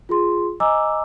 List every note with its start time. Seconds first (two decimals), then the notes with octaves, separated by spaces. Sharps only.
0.09 F4 G#4 C6
0.60 D#5 G#5 A#5 D6 E6